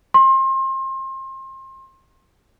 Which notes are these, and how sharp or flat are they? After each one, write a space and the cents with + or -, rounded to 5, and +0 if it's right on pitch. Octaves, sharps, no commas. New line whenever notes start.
C6 +30